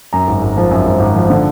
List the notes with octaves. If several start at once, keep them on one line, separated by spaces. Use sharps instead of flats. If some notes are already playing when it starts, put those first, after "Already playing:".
F#2 A#5
G#1
G#1
F3
F#2
G#1
G#1
F3
D3